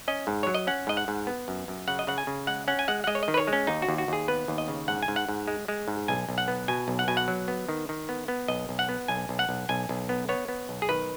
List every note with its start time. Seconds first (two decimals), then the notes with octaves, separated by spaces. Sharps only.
0.08 C#4 D#5
0.27 G#2
0.43 F#3 C#5
0.54 D#5
0.67 C#4 F#5
0.87 G#2 D#5
0.97 F#5
1.08 G#2
1.27 B3
1.48 F#2
1.68 F#2
1.88 C#3 F#5
1.99 D#5
2.07 C#3 F#5
2.18 G#5
2.27 C#3
2.47 G#3 F#5
2.68 C#4 F#5
2.79 G#5
2.88 G#3 F#5
3.04 F#5
3.07 G#3 D#5
3.15 C#5
3.23 D#5
3.28 D#3
3.34 B4
3.37 C#5
3.47 G#3
3.53 C#4
3.67 D#2 D#4
3.82 F#4
3.88 D#2
3.98 F#4
4.08 D#2 G#4
4.28 B3 B4
4.48 D#2
4.58 D#5
4.68 C#3
4.88 G#2 F#5
5.03 G#5
5.08 G#2
5.16 F#5
5.29 G#2
5.48 G#3
5.68 G#3
5.88 G#2
6.08 B1 G#5
6.29 B1
6.38 F#5
6.48 B3
6.68 B2 G#5
6.88 B1
6.99 F#5
7.08 B2 G#5
7.17 F#5
7.28 F#3
7.48 B3
7.69 D#3
7.89 D#3
8.09 B3
8.28 B3
8.48 B1 D#5
8.69 B1
8.79 F#5
8.89 B3
9.08 B1 G#5
9.29 B1
9.39 F#5
9.49 B1
9.69 B1 G#5
9.89 B1
10.09 B3
10.29 B3 C#5
10.48 B3
10.69 B1
10.82 G#4
10.89 D#3 B4